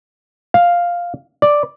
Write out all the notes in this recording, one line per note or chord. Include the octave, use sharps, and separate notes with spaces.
F5
D5